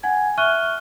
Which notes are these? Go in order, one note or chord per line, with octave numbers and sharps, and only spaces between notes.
F#5 G#5 G#6
E5 C#6 F6 F#6 D#7 G7